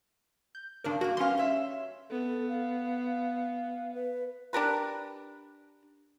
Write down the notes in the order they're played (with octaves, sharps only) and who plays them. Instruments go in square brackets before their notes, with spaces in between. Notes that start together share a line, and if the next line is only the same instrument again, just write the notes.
[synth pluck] G6
[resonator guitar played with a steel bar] G2 C#3 D5 [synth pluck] D4 A#4
[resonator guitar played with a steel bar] G2 A#3 [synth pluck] F#4
[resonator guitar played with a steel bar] G3 B3 F5 [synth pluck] C#4 C6
[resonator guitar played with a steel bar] C#5 E5
[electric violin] B3 [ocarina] A4
[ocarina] F5
B4
[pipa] D4 G4 A#4 B4